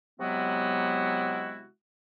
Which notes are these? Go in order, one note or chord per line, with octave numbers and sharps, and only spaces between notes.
C3 F#3 G#3 B3 E4 F#4